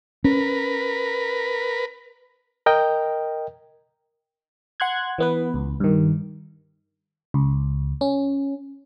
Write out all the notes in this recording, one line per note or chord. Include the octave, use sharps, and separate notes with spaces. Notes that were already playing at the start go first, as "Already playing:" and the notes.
C#4 A#4 B4
A#4 D#5 G5
F#5 C6 F#6 G#6
E3 B3 B4
C#2
G2 D#3
C#2
C#4